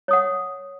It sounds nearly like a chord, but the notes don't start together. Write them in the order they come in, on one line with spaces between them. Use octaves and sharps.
C#5 D#6 F#5